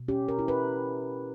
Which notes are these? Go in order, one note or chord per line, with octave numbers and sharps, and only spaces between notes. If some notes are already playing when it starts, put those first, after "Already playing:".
Already playing: B2
C#4 G4
A#4
E4
B4